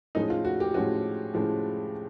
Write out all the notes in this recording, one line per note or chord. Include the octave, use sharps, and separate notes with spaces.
A2 F3 G#3 C#4 D#4
F4
F#4
G4
A2 F3 G#3 C#4 F#4
A2 F3 G#3 C#4